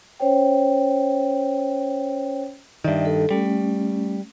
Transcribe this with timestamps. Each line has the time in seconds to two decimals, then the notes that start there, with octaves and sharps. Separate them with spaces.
0.20 C#4 C5 C#5 G5
2.84 G2 D#3 D5 E5 G5
3.05 A4
3.30 G3 A3 C#4